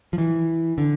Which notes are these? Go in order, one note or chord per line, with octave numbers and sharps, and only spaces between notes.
F3
E3
D3